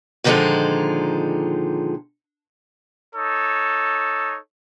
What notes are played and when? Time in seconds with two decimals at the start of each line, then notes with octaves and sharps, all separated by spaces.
0.24 A#2 D3 D#3 F3 G#3 A4
3.15 D#4 A4 C#5